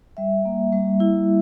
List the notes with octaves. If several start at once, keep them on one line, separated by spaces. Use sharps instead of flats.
G3 E5
A#3
G3
E4